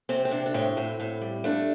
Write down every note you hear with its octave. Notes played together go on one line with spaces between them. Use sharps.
C3 C4
C4
C3 D4
D4
A2 C4
A2
A2
G3
A3 D4